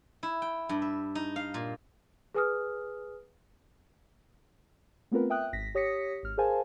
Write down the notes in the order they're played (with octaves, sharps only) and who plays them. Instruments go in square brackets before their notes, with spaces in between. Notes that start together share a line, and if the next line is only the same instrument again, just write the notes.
[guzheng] E4
G5
G2
E5
D#4
F5
A#2
[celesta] G#4 B4 G#5 D#6 F6
[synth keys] A3 B3 C4 F4 A#4 B4
E5 G5 D#6 F#6
G#1 A#6 B6
G4 C#5 D#6 A#6 B6 C#7
G#1 F6
G#4 A#4 C5 F5 G#5 A5